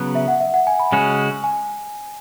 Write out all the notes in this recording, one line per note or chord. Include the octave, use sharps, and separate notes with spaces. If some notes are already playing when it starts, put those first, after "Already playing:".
Already playing: C#3 F#3 B3
E5
F#5
E5
F#5
G#5
B5
C#3 G#3 C#4 F#4 G#5
G#5